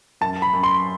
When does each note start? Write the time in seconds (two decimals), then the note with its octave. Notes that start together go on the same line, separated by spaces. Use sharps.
0.21 F#2 A5
0.42 B5
0.53 F#2
0.63 C6